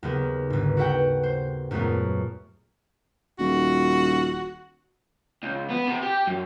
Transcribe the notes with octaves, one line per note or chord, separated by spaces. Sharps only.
D#2 C#3 B3
G1 G#2
F#4 A4 B4 F#5 G5
C5
F#2 A#2 G#3 A3 B3
D#1 F#4
C#2
B3
C3
G4
F#2